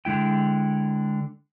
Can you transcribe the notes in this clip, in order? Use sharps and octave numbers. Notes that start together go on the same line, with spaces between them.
D3 G#3 E4 G5